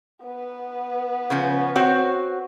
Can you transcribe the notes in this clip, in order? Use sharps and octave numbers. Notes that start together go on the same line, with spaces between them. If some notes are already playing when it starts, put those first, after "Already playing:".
B3 B4
C#3 F3 C#4
C4 F#4 C#5